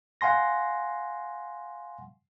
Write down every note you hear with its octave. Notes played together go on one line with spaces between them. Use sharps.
F5 F#5 G#5 C6 A#6